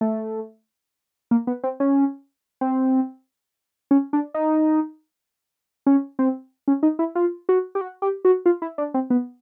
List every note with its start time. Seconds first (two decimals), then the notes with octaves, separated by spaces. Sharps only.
0.01 A3
1.31 A#3
1.47 B3
1.64 C4
1.80 C#4
2.61 C4
3.91 C#4
4.13 D4
4.34 D#4
5.86 C#4
6.19 C4
6.68 C#4
6.83 D#4
6.99 E4
7.15 F4
7.49 F#4
7.75 G4
7.81 F#4
8.02 G4
8.25 F#4
8.46 F4
8.62 E4
8.78 D4
8.94 C4
9.10 B3